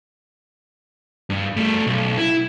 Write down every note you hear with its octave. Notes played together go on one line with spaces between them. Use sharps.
G2
G3 A3
B1
E4